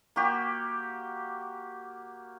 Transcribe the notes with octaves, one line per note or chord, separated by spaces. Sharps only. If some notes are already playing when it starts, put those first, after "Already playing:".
A#3 F#4 G4